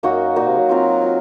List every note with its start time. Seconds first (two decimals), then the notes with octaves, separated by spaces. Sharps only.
0.03 F#2 A#3 D#4 F#4
0.36 A#2 A#3 D#4 F#4
0.47 C3
0.58 F#3
0.69 C4 F4 A#4
1.02 C4 F4